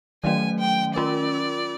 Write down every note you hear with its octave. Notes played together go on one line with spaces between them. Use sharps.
D#3 F#3 A3 C#4 G#5
G5
C#4 F4 A#4 D5